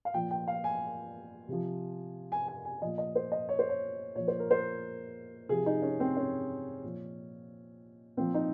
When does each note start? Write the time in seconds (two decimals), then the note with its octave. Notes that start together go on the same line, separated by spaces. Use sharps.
0.05 F5
0.14 A#2 F3 G5
0.31 G5
0.48 F5
0.64 G#5
1.48 C3 F3
2.32 G#5
2.48 G#5
2.65 G#5
2.81 A#2 F3 D#5
2.98 D#5
3.15 C5
3.32 D#5
3.49 C#5
3.59 C5
3.69 C#5
4.15 A#2 F3 C#5
4.28 C5
4.39 A#4
4.51 C5
5.49 C3 F3 G#4
5.66 D#4
5.82 C#4
6.00 C4
6.17 C#4
6.84 A#2 F3
8.17 A#2 F3 C4
8.34 D#4